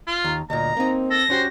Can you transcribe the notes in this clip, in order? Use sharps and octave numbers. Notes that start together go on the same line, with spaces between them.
F4
D#2 A#5
D2 A#2 D#5 A#5
A#3 C4 D#4
A4 A#6
C#4 F#4 G4 C5